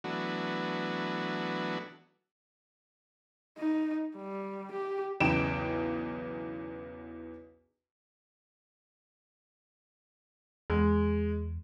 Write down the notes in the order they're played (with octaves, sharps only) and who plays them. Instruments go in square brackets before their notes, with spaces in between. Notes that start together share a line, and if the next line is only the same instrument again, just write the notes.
[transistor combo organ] E3 F#3 A3 B3 D4 F#4
[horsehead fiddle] D#4
G3
G4
[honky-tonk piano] B1 E2 C#3 G5 D7 E7
[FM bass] E2 [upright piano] G#3